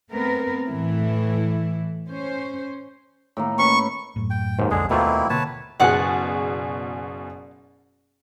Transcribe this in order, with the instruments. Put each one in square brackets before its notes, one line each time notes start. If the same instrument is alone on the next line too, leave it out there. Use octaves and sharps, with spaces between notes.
[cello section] A3 B3 C4 A#4 B4
A2 E3 E4
C#4 C5
[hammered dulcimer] A2 D#3 A#3
[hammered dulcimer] C#4 B4 B5 [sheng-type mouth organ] C#6
[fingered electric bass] F#2 A2
[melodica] G5
[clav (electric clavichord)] D#2 G#2
[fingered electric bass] B1 F2 [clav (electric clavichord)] D3 G#3 [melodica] G#4
[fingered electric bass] D#2 [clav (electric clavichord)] B2 A3 F4 [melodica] A#3 C4 E4
[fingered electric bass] B2 D3 A#3 [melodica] B4 C#5 A5
[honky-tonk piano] F#1 B2 G#4 [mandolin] D5 F#5 F#6